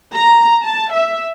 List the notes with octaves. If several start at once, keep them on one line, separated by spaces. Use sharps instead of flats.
A#5
A5
E5